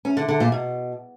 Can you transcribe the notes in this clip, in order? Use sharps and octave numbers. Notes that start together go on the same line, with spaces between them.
C#4
D3
D3
A#2
B2